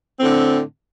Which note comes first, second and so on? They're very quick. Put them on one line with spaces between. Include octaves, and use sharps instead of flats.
C4 A2 D3